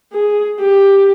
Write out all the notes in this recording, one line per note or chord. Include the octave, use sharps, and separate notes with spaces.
G#4
G4